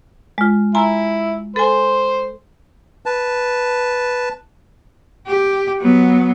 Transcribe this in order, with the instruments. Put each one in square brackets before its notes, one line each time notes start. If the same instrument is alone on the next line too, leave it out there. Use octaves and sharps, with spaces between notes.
[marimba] G#3 F4
[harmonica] E4 [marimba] G#5 A#5 C6
[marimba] A4 G#5 [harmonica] C5
[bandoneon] B4 A5
[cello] G4
F#3 B3